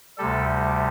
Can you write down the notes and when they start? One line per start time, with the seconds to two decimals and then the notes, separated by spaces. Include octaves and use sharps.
0.18 D2 C3 G3 A4